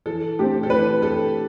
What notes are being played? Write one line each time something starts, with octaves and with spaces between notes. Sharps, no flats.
E3 A4
A3 C4 G4
A4
E3 B4
A4